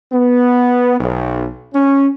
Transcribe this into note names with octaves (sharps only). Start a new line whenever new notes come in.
B3
B1
C#4